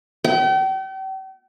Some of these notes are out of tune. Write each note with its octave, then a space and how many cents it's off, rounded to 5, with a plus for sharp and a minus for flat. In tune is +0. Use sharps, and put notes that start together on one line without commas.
G5 -40